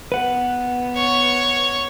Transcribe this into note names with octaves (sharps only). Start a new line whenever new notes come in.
B3 B4 F#5
C#5 C#6